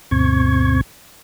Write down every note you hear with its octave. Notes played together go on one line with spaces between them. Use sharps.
D2 G2 B2 C4 C#6 G#6